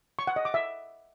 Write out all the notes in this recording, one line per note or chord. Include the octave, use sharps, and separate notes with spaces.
C#6
F#5
D#5
D6
E5